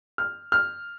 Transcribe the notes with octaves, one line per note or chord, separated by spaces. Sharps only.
F6
F6